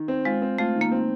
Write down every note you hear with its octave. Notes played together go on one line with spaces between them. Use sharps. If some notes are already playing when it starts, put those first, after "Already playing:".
Already playing: D#3
C4
G#3 F4
C4
A3 F4
D#3
A#3
C4